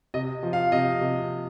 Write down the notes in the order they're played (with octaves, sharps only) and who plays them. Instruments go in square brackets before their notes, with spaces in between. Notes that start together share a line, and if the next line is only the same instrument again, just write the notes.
[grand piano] C3 D#5
F3
F5
C3 D#5
C3